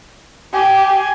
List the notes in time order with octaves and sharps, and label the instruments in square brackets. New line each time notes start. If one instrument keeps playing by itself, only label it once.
[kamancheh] G4 [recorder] G#5